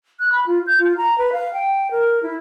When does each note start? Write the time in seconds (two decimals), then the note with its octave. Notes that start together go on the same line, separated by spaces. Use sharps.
0.20 F#6
0.32 B5
0.47 F4
0.67 G6
0.79 F4
0.97 A#5
1.18 B4
1.33 F5
1.53 G5
1.91 A#4
2.23 E4